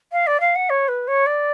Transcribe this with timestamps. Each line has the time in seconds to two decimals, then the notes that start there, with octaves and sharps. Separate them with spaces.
0.12 F5
0.26 D5
0.40 F5
0.55 F#5
0.69 C#5
0.88 B4
1.07 C#5
1.26 D5